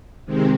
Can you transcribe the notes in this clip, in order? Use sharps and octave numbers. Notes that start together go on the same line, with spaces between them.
C3 D#3 G#3 C4